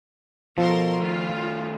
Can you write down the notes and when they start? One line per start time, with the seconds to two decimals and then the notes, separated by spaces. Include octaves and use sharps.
0.58 B2 F3 A4 A#4 C6
1.00 D#3 A3 F4